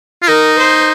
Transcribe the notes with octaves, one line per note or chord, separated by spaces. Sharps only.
F4
D#4 A#4
C5